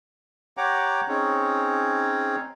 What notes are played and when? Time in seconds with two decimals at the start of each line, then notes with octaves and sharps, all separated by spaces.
0.57 G4 C#5 F#5 G5 A#5 D6
1.08 C4 C#4 D#4 G#4 C#5